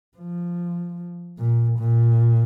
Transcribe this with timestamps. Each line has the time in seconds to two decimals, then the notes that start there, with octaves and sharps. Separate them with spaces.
0.18 F3
1.39 A#2
1.79 A#2